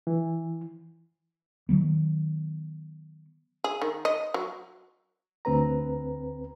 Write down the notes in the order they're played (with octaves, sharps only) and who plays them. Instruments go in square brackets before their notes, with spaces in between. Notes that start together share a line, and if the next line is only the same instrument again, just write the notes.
[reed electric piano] E3
[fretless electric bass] D#3 F3 F#3 B3
[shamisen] G#4
D#3
D#5
F#3
[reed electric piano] D2 C4 B4 A#5